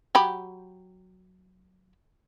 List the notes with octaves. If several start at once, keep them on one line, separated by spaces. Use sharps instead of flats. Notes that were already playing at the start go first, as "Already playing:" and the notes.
F#3 G4 B5